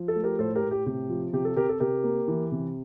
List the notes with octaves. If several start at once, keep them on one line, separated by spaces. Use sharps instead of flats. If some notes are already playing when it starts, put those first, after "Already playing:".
Already playing: F3
A4
A3
G4 A#4
A2 A4 C5
G4 A#4
A2
G4
C3 G4
F3
C3 G4
A4
C3 G4 A#4
A4
C3 G4 A#4
A#3
E3
C3